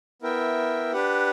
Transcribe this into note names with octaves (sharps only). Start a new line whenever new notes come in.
B3 E4 A#4 E5 G5
D4 G4 B4 F#5